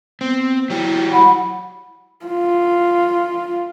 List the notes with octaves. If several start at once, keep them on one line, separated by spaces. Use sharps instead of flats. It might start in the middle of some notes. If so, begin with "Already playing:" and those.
B3 C4
F#3 E4 G4
F#5 B5
F4